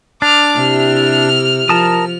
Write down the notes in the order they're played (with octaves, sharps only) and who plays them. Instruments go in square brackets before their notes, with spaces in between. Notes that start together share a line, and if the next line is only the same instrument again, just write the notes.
[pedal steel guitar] D4 [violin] D6 F6
[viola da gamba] C3 E4 G4 [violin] F6
[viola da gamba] F3 [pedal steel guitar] A#4 A5 D#6